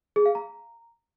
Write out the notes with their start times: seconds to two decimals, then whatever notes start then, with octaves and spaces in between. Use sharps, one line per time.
0.16 G#4
0.26 F5
0.35 A#5